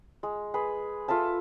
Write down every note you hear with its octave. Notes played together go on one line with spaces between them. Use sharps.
G#3
G#4 B4
F4 A4 E5 A5